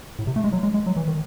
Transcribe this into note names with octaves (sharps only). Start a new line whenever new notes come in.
A2
C3
A3
G#3
F#3
G#3
G#3
F#3
E3
D#3